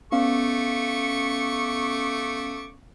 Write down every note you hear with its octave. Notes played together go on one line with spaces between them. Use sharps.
A3 B3 C#4 F5 C#6 D6